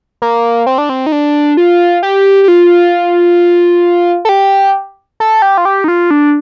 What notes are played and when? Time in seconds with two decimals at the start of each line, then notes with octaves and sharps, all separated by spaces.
0.22 A#3
0.66 C4
0.78 D4
0.89 C4
1.06 D#4
1.12 D4
1.57 F4
2.03 G4
2.43 G4
2.48 F4
4.25 A4
4.29 G4
5.20 A4
5.42 G4
5.58 F4
5.65 G4
5.84 D#4
5.88 F4
6.11 D4